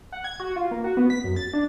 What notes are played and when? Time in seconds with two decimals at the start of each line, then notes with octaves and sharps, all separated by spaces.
0.12 F#5
0.24 G#6
0.40 F#4
0.56 F4
0.71 A#3
0.84 F#4
0.97 B3
1.10 B6
1.24 F#2
1.36 A6
1.54 D4